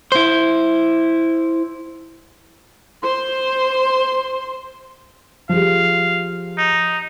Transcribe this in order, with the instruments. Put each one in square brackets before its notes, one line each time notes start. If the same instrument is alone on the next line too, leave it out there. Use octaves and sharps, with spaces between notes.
[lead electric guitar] E4 C5
[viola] C5 C6
[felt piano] F3 G4 G#4 [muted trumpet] F5
[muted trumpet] D#4